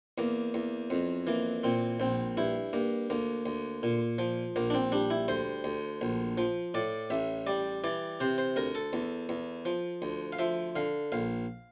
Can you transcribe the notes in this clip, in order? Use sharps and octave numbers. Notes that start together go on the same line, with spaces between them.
E2 A#3
E2
F2
E3 A#3
A#2 C4
A#1 C4
G2 E4
G2 A#3
D2 A#3
D2
A#2
F3
A#1 A#3
D4
C4
G3 D4
E4
D2 C5
D2
A#1
F3
A2 D5
A1 E5
G3 D5
E3 D5
C3 C5
C5
D2 A#4
A4
E2
E2
F3
D2
F5
F3 E5
D3 F5
A#1 F5